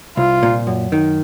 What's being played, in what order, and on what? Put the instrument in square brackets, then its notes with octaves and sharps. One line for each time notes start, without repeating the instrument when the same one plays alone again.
[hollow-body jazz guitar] C2 [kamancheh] F4
[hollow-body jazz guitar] A#2
F#2
D#3